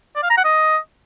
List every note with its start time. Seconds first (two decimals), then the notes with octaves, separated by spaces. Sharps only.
0.16 D5
0.23 F5
0.30 A#5
0.37 F#5
0.44 D#5